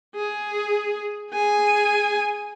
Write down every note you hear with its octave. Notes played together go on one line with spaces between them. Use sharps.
G#4
G#4 G#5